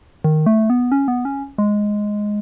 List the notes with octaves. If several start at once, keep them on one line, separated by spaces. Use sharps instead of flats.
D#3
A3
B3
C#4
B3
C#4
G#3